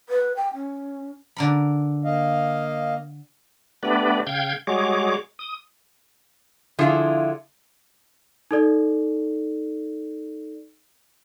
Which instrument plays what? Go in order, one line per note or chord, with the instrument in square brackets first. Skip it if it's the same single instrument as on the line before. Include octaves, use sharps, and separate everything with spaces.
[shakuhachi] B4
G5
C#4
[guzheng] D3 A#4 B5
[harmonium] A#3 D#5 F5
[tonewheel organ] A3 B3 D4 G4 B4 D5
C#3 F5 G5 G6 G#6
G3 G#3 F#4 G#4 C#5 D6
D#6
[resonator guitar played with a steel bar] D3 F3 E4 F4 G#4
[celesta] D#4 A4 D5